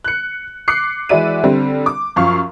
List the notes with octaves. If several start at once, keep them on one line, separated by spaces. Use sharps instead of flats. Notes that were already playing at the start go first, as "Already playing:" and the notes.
F#6 C#7
D6 F#6 C7 C#7
E3 G#3 F#4 D5 E5 D#7
D3 G3 C4
D6
F#2 F3 F5 C#6